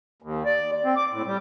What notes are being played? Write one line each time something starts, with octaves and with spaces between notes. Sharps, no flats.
D#2
D5
C4
D6
A2
G3